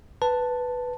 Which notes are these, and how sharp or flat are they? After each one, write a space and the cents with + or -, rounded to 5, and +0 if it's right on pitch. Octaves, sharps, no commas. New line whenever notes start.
B4 +0 A5 +5